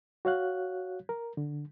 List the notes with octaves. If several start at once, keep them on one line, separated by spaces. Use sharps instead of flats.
F#4 C#5 F5 F#6
A#4
D3